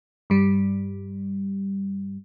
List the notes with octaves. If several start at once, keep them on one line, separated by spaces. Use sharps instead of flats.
G2 G3